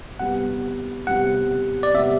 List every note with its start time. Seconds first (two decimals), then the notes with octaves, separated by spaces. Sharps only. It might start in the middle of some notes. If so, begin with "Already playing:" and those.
0.20 C3 G3 B3 F#5
1.07 C3 G3 B3 F#5
1.83 D5
1.94 C3 G3 B3 E5